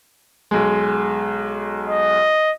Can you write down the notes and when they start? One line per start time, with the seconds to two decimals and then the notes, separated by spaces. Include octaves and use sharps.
0.51 B1 G#3
1.87 D#5